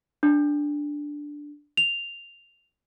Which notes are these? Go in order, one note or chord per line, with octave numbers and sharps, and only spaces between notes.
D4
F7